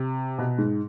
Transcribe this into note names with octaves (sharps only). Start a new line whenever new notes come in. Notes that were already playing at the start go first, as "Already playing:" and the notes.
Already playing: C3
B2
G#2